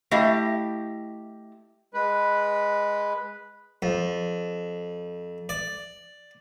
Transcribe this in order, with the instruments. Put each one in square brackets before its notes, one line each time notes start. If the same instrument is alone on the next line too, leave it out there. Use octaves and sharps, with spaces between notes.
[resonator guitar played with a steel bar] A3 E4 G4 D#5 F5
[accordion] G#3 B4
[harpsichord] F2
D5